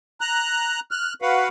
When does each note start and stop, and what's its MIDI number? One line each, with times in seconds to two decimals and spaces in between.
0.21 0.80 82
0.21 0.80 90
0.91 1.13 89
0.91 1.13 90
1.22 1.49 66
1.22 1.49 71
1.22 1.49 77
1.22 1.49 78